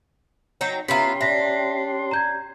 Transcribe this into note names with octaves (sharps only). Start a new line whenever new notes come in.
F#3 D#4 G5
B3 C#4 E4 F4 G4 A#5 C6 B6
D4 E5 A#6 B6
A#5 G6 G#6